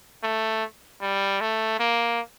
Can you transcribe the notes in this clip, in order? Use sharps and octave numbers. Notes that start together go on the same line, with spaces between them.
A3
G3
A3
A#3